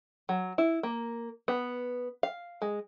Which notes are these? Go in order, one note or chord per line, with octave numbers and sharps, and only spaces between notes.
F#3
E4
A#3
B3
F5
G#3